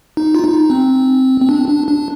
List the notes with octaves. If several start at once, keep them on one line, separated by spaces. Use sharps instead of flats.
D#4
F4
D#4
C4
C4
D4
D4
D4